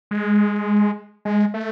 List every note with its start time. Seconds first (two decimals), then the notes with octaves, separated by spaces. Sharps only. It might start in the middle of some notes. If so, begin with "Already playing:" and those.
0.11 G#3
1.25 G#3
1.54 A3